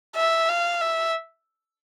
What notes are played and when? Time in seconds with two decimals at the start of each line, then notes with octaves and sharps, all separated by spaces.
0.16 E5
0.49 F5
0.81 E5